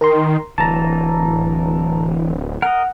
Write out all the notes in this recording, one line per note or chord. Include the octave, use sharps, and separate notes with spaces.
D#3 A#4 A#5 C6
D1 E3 A5 A#5
A#4 D#5 F#5